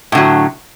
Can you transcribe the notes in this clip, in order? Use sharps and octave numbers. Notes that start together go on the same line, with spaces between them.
A2 D3 F#3